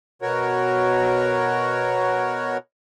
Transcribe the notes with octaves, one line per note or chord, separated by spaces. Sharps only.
B2 F#4 A#4 C#5